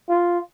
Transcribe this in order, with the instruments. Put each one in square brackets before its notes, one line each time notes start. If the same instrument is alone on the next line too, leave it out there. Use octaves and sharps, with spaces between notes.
[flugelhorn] F4